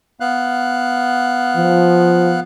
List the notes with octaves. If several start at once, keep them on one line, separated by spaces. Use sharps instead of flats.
B3 F5 F#6
F3